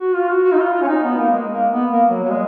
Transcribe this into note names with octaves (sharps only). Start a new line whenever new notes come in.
F#4
F4
F#4
F#4
D#4
F4
F4
C#4
D#4
B3
A#3
G#3
A#3
B3
A#3
F#3
F#3
G#3